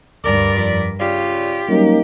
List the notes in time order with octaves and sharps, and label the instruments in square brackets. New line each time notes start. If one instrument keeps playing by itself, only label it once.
[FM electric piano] D2 [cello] G2 A#4 [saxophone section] D5
[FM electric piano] F2 F3 B6
[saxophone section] C#3 F4 [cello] G4 [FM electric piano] D5
[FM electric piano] F#3 G3 [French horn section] A#3 C#4 D#4